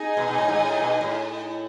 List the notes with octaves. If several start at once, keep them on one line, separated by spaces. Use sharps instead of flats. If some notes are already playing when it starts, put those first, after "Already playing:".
Already playing: D#4 G#4 D#5 G#5
B2
B2
A2
G#2
A2
B2
A2